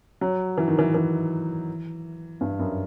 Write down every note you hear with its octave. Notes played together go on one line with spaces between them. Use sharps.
F#3
E3
D#3
E3
E3
G2
F#2